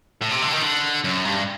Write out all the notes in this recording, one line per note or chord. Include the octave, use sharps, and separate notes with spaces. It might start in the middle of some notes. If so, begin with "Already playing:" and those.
A2
C3
D3
D#3
D3
F#2
G2